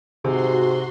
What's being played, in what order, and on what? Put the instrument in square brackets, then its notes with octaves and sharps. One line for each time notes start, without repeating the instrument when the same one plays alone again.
[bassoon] G#2 [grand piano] C3 [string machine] F#4 C6